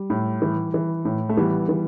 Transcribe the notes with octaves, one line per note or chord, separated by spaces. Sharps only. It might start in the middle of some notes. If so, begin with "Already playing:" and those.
Already playing: G3
A2
E3
E3
A2
A3
E3 G3 B3
E3